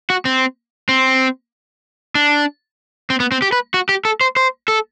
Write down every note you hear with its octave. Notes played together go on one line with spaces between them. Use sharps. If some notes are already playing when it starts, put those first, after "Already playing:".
F#4
C4
C4
D4
C4
B3
C4
G4
B4
F#4
G4
A4
C5
C5
A4